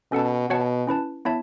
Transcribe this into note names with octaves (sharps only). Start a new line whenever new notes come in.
B2 C#4 A4 F#5 A5
B2 F#4 C#5 F#5 A5
C#4 E4 B4 A5
B3 E4 C#5 E5 A5